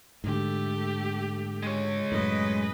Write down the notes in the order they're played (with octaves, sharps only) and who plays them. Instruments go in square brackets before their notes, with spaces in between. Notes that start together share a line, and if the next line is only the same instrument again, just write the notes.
[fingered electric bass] G#2 D3 [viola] A3 G4
[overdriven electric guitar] G#3 C#5
[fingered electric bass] F#2 A2 [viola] B4 D#5